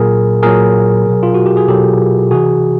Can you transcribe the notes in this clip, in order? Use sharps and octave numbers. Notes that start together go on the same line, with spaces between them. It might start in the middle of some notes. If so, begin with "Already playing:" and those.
Already playing: A#2 F#3 G#4 A#4
A#2 F#3 G#4 A#4
B2 F#3
F4
F#4
G4
G#4
B2 F#3 G4 A4
C3 E3 F#4 G#4